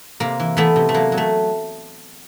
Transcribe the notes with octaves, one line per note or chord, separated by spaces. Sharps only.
C3 A#3
E3
E3 A3 B3
C3
A3
F#3 A#3
F#3
A3